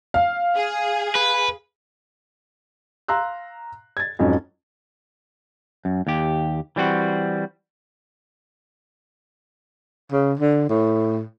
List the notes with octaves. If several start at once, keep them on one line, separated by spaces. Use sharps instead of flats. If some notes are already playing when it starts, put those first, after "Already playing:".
F5
G#4
B4
F5 A#5 C6 E6 F#6
G#6 A6
F2 G#2 F#3 C#4
F#2
D#2 G4
E3 G3 C4 F#4
C#3
D3
A2